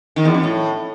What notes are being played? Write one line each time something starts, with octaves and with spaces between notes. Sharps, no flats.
D#3
E2
F2
A2